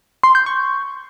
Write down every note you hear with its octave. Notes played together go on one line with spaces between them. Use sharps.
C6
G6
C#6